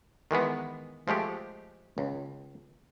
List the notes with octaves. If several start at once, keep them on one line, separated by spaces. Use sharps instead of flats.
D#3 E3 G#3 B3
F3 G#3 A3 G4
C#2